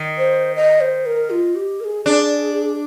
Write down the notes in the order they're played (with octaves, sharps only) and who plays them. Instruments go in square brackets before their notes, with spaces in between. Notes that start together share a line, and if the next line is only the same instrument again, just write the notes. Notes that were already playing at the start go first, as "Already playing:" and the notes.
Already playing: [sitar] D#3
[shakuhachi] C5
D#5
C5
A#4
F4
G4
A#4
G#4
[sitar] D4 [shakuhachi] G#4